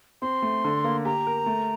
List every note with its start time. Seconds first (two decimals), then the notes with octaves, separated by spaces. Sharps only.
0.22 C4 C6
0.42 A3
0.64 D3
0.84 A#3
1.05 G4 A#5
1.27 A#4
1.46 A3